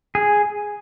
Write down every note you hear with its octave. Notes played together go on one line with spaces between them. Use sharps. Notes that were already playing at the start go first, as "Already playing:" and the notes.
G#4